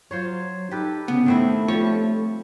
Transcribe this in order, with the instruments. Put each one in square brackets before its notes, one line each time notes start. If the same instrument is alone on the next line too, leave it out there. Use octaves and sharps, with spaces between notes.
[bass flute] F#3 [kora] F4 C5 C#5
[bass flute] D#4 [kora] G4 A4 B4
[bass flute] C#3 [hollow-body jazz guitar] B3
[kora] D#3 C4 E4 [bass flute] A3
[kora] F3 G3 [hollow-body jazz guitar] C#5